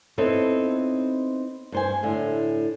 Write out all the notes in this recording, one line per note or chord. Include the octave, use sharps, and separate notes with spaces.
B3 C4 D#4 E4 A4 C#5
G2 C5 G#5
A2 D3 E5